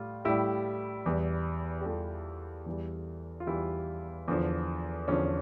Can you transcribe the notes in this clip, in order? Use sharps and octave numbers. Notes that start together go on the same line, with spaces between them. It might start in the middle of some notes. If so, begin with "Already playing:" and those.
Already playing: A2 G3 F4
A2 G3 E4 G4
E2 E3 G3
G4
E2 E3 G3 F4 A4
E2 E3 G3
F4
E2 E3 G3 E4 G4
E2 D3 F3
E2 D3 F3 C#4